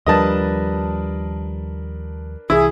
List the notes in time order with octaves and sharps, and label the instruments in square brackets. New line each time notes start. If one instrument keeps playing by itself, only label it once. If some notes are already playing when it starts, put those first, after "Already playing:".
[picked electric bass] D#2 F3 G3 [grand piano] D4 A#4 B4 [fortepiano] D#5 A5
[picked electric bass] C2 E3 [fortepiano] E4 [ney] G#4